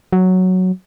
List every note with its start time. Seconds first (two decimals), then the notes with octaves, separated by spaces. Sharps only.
0.13 F#3